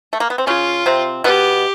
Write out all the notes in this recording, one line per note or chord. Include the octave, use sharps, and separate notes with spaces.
A3
A#3
B3
C4
C#3 C#4 F4
C3 C4
B2 B3 G4